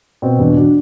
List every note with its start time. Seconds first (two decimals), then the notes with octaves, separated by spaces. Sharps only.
0.22 B2 C4
0.39 E2 B3 D4
0.57 D4 F#4